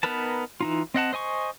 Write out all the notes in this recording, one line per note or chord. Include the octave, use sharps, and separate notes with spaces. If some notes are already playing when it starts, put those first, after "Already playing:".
B3 D#4 A#4 B4 A5
E3 D#4 F4
C4 D#5 F#5 A5
C5 D#5 G#5 C#6